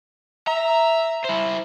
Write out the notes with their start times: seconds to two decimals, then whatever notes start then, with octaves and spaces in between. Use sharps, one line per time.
0.47 E5 A#5
1.24 E4 C5